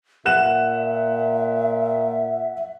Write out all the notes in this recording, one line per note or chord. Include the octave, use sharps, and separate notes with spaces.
A#2 E5 F#5 F#6 E7